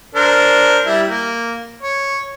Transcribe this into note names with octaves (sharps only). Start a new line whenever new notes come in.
D4 A#4 C5
G3 E4
A#3
C#5